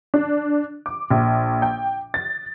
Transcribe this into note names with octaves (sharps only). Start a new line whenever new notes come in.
D4
D6
A#1
G5
A6